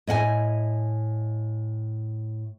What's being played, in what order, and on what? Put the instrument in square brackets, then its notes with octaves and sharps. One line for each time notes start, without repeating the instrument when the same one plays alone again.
[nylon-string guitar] A2 D#5 F#5 G#5